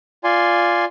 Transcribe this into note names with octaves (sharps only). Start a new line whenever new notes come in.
F4 D5 G#5 C6